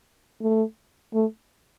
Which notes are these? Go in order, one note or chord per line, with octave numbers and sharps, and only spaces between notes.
A3
A3